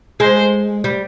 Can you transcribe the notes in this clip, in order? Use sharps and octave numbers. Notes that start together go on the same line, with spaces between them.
G#3 C5
G3